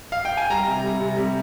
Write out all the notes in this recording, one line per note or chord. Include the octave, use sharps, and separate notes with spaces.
F5
G5
G#5
G3 A#5
C3
G3
C3
G3